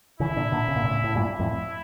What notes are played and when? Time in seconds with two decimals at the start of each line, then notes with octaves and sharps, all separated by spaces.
0.20 C#3 E3 E4
0.36 A#2 D3
0.52 A#2 D3
0.68 C#3
0.76 A#2
0.84 A2 C#3
1.04 A2
1.15 G2 A#2 E4
1.39 F2 A2